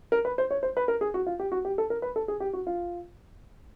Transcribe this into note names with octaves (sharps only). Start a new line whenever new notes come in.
A#4
B4
C5
C#5
C5
B4
A#4
G#4
F#4
F4
G4
F#4
G4
A4
A#4
B4
A4
G#4
G4
F#4
F4